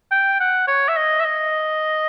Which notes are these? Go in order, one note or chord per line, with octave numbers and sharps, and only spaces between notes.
G5
F#5
C#5
E5
D#5
E5
D#5